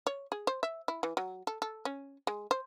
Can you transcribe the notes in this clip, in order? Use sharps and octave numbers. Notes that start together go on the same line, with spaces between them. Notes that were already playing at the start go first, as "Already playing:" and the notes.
C#5
G#4
C5
E5
E4
E3
F#3
A4
A4
C#4
G#3
C5